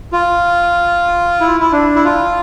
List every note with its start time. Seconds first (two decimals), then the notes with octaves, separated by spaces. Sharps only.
0.12 F4
1.41 E4
1.61 E4
1.72 D4
1.95 E4
2.05 F4